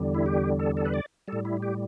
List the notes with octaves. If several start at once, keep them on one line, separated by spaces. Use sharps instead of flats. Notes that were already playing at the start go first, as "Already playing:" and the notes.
Already playing: E2 D3 G3
E4
G4
A4
A4
B4
D5
A2 G3 A4
E4
G4